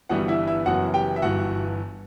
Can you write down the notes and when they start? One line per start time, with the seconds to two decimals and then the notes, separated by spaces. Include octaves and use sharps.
0.09 G1 G2 E3 G3 B3 F#4 F#5
0.28 E4 E5
0.47 E4 E5
0.66 F#1 F#2 E3 B3 F#4 F#5
0.94 G4 G5
1.16 E5
1.22 G1 G2 E3 F#4 F#5